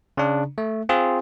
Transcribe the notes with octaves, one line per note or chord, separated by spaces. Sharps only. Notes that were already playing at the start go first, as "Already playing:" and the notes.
C#3 D4
A3
C4 F4 G#4